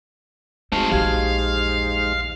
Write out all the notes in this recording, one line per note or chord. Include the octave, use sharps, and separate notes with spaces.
G#3 A3 C4 D#4 F#4 C5 F5 A5
A#1 E2 G4 F5 G#6